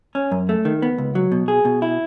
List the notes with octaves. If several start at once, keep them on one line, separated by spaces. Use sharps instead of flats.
C#4
F#2
A3
D#3
B3
C#2
F#3
B2
G#4
B2
E4